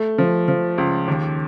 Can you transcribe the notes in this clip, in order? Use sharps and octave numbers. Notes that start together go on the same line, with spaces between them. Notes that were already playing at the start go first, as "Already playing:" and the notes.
Already playing: A3
F3
F3
C#2
D#2